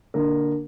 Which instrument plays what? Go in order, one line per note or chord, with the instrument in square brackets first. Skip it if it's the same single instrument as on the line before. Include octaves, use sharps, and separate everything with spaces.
[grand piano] D3 A#3 D4 A#4